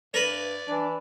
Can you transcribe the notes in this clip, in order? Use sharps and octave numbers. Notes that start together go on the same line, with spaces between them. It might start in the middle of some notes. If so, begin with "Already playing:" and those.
G2 A#4 B4 D5
E3 D4